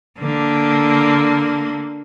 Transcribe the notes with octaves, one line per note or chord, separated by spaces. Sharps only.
D3 A#3